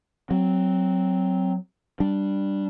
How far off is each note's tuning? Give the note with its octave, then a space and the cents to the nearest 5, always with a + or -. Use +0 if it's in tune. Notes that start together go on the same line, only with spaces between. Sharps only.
F#3 +10 C4 +0
G3 +0 D4 +0